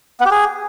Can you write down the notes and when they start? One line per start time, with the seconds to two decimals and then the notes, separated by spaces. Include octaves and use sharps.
0.21 B3
0.26 G4
0.31 G#4